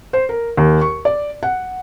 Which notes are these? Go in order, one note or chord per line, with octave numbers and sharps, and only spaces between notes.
C5
A#4
D#2
C#6
D5
F#5